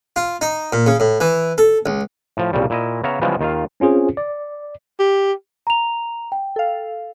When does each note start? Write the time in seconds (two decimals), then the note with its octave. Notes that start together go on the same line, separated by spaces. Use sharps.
0.16 F4
0.41 D#4
0.73 A#2
0.87 C#3
1.00 A2
1.21 E3
1.58 A4
1.86 C#2
2.37 A2 F3
2.53 C2 A#2 C#3 G3
2.70 A#2 E4 D#5
3.03 C#3 B3 C#5 E5 F5 A#5
3.21 C#3 E3 F3 G3 G#3 B3
3.39 D#2 D#3 F4 F5
3.80 C4 C#4 F4 G#4 C5
4.17 D5
4.99 G4
5.67 A#5 F7
6.32 G5
6.56 A4 F5